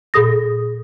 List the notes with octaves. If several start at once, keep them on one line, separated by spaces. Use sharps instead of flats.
A#2 G#4 A4 D#6 A#6